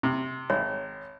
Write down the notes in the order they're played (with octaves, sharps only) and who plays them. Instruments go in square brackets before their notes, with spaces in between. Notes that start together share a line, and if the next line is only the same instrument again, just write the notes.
[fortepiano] C3
[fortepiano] G#1 [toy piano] C#5